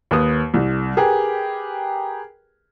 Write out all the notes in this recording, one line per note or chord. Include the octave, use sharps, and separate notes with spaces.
D#2 B4 D#6
C2
G4 G#4 A#4 B4